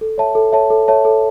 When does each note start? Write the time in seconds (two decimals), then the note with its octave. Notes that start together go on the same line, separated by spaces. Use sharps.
0.01 A4
0.18 C#5 E5 A5
0.35 A4
0.53 C#5 E5 A5
0.70 A4
0.88 C#5 E5 A5
1.05 A4